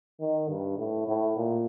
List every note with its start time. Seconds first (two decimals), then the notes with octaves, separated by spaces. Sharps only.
0.20 D#3
0.48 G2
0.78 A2
1.07 A2
1.36 A#2